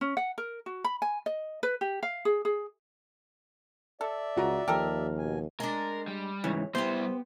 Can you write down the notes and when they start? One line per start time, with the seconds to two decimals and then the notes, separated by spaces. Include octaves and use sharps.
0.01 C#4
0.17 F#5
0.38 A#4
0.66 F#4
0.84 B5
1.02 G#5
1.26 D#5
1.63 B4
1.81 G4
2.03 F5
2.25 G#4
2.45 G#4
4.01 A4 D5 E5
4.36 C#2 F4 F#4 A#5
4.68 D#2 F3 G4 A4 A#4
5.18 B2 G#5
5.60 G#3 D4 A#4
6.08 G3
6.44 G#2 C#3 E3 C#5
6.75 G3 B3 E4 G4 C5